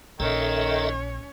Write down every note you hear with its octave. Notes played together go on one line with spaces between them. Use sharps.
A#1 D#3 C#4 A4 C#5 D#5 E5